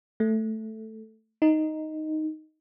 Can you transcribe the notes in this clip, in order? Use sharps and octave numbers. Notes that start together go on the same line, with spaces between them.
A3
D#4